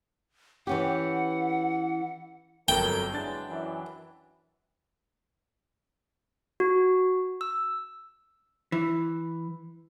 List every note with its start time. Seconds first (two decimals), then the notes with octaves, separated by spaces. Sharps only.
0.67 E3 C#4 G4 F#5
2.68 G1 F2 F#3 A4 A#4 G5 G7
3.14 E3 F#3 G#3 D4 A6
3.49 F#2 E3
6.60 F#4
7.41 E6
8.72 E3